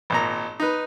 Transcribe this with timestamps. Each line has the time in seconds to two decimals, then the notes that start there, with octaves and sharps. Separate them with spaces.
0.10 G#1 A#2 A#5
0.60 D#4 B4